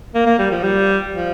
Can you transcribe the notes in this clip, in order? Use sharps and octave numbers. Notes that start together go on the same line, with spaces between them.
A#3
A#3
G3
F3
G3
F3